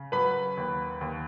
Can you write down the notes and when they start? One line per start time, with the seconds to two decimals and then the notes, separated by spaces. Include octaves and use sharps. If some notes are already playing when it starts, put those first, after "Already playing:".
Already playing: C#3
0.12 F#3 B4 B5
0.57 D#2
1.01 D#2